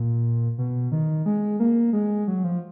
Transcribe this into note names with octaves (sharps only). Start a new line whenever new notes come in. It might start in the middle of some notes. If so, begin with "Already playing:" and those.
Already playing: A#2
B2
D#3
G#3
A#3
G#3
F#3
F3